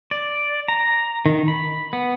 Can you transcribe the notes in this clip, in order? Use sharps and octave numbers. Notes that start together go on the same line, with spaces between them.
D5
A#5
D#3
B5
B3